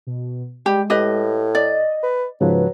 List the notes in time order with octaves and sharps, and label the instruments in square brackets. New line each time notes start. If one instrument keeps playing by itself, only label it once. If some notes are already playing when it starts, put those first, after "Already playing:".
[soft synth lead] B2
[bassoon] G3 [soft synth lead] G#3 [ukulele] G4
[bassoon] A2 [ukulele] G4 B4 D#5
[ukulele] D5 [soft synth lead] D#5
[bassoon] B4
[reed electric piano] G#2 C#3 F3 [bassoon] F#3 [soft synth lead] B4